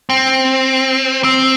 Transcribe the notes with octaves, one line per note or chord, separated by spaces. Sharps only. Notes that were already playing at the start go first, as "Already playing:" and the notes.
C4
C4